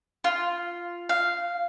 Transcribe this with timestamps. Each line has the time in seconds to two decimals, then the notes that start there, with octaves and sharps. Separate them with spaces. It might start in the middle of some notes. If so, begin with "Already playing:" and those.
0.24 F4
1.09 F5